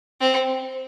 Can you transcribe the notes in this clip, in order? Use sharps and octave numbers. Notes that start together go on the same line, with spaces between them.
C4